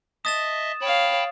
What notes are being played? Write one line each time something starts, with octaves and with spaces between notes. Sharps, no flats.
D#5 E5 A5 D#6 A6 E7
C#5 F5 G5 A5 B5